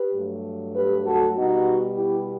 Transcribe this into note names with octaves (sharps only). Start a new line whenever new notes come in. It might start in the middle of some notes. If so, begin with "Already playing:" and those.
Already playing: G4 B4
G2 F#3 A3
G4 B4
F#4 A4
B2 G3 B3 D#4 F#4
E4 G4